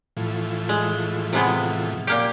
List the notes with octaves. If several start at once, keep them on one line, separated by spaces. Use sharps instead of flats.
A2 E3 F3
G#3
C3 G#3 B3
A#2 A#3 G4